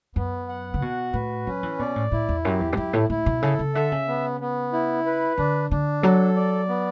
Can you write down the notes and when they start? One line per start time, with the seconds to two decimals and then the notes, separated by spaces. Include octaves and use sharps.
0.16 F#2 B3
0.48 F#5
0.74 C#3
0.82 B2 F#4
1.13 A2 B4
1.47 F#3 C#4
1.63 E3
1.79 B2 D5
1.96 A2
2.12 A2 E4
2.29 E2
2.44 F#2 G4
2.60 E2
2.73 G2
2.77 F#2 E4
2.93 A2
3.10 A2 E4
3.26 B2
3.42 C#3 A4
3.59 C#3
3.75 D3 E5
3.92 C#3
4.08 B3
4.41 B3
4.73 E4
5.06 B4
5.38 D3 D4
5.71 D3 D4
6.03 F#3 A4
6.36 D5
6.69 B3